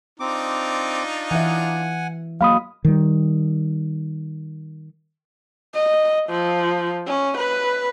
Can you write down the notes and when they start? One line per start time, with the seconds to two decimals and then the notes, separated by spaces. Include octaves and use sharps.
0.20 C4 D4 D#4 F4 D6
1.31 E3 E5 F#5 G#5
2.41 F#3 G#3 A#3 F5 B5 D#6
2.85 D#3 G3
5.75 D#5
6.29 F3
7.07 C#4
7.37 B4